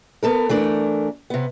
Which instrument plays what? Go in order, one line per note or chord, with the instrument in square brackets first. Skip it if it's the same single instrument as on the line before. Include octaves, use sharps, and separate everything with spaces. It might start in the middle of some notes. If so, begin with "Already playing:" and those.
[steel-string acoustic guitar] B3 A4 A#4
E3 A3 D4 A#4
C3 B3